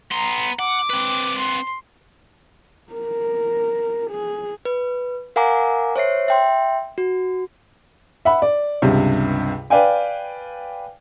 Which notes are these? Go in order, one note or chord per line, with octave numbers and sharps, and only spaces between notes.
B3 A#5 C6
F#5 D6
C4 B4
C6
A#4
G#4
B4
A#4 F5 F#5 G#5 A#5 D6
C5 C#5 E5 C7
E5 G5 C6
F#4
E5 F#5 B5
D5
C#2 G2 C3
B4 D5 F5 G5 G#5